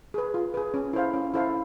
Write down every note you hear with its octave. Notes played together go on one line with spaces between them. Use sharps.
G#4 B4
F4
G#4 B4
C#4
E4 A4 C5 F5
C#4
E4 A4 C5 F5